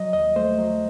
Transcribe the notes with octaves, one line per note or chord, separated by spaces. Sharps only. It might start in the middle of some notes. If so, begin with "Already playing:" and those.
Already playing: F#3 D#5
D#2 D#5
A3 C5
F#3